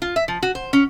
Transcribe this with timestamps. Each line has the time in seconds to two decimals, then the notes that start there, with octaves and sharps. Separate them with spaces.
0.02 F4
0.16 E5
0.28 F3
0.43 F#4
0.55 C5
0.73 C#4